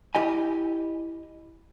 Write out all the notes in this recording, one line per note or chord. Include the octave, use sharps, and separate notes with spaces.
E4 G4 D#5 G#5